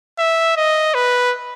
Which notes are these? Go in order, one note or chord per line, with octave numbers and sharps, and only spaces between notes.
E5
D#5
B4